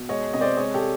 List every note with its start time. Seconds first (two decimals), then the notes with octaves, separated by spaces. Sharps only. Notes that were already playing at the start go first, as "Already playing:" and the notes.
Already playing: B2
0.09 G#3 C#5 D#5
0.33 C3 D#5
0.41 C5 D5
0.57 G#3 C#5 D#5
0.74 G4 A4